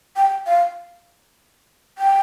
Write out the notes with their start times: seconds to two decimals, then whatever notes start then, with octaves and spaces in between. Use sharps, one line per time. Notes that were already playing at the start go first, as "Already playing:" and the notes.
0.16 G5
0.46 F5
1.98 G5